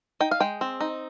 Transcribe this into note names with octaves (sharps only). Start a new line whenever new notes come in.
D#4 G5
F5
G#3 G5
C4
D#4